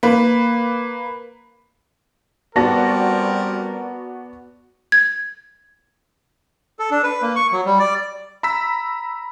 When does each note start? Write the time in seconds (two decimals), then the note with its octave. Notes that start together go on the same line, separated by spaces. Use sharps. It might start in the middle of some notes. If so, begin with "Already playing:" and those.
0.03 A#3 B4
2.56 G3 B3 C4 F#4 A#4 D5 A5 A#6
4.92 G#6
6.79 A4
6.91 D4
7.04 B4
7.22 A#3
7.36 C#6
7.52 F#3
7.66 G3
7.79 D5
8.43 A#5 B5 E6 B6